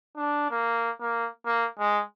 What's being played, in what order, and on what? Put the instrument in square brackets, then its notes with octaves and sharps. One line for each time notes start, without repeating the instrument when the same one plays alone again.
[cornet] D4
A#3
A#3
A#3
G#3